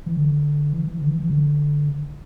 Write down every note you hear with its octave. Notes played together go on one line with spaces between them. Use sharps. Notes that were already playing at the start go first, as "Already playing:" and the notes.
E3
D3
E3
E3
D3
E3
E3
D3